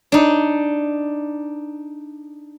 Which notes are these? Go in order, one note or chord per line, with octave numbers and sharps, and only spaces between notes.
D4 D#4